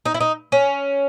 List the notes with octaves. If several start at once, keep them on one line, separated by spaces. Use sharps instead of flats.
D#4
E4
D#4
C#4